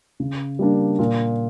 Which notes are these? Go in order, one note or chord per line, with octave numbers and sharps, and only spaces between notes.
C#3
G3 A#3 D4
A#2